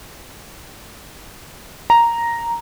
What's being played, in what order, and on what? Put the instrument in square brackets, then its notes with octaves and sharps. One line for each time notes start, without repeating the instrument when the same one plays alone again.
[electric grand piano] A#5